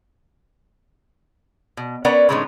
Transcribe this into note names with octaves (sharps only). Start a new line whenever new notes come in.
B2
B3 C#4 A#4 B4 D5 F#5
A2 D3 G#3 B3 C#4 D#4